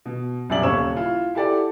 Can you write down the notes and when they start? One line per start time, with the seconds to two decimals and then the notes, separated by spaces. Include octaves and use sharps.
0.06 B2
0.49 C2 F#2 B2 D5 E5 F#7
0.63 D#1 C#3 C#5 C#6 E6 E7
0.95 E4 F4
1.35 E4 G4 A4 D5 F#5